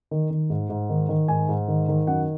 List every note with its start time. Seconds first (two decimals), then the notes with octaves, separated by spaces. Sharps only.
0.11 D#3
0.30 D#3
0.50 G#2
0.69 G#2
0.90 D#3
1.09 D#3
1.28 G#2 G#5
1.49 G#2
1.68 D#3
1.88 D#3
2.07 F#2 F#5